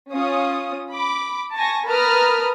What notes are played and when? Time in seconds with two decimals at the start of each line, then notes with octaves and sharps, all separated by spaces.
0.12 C#4 F4 F5 D#6
0.92 B5 D6
1.56 G#5 A5 C#6 A#6
1.86 A#4 B4 A5 B5 D#6 F6